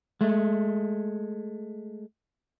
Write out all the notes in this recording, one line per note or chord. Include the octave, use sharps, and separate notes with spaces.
G#3 A3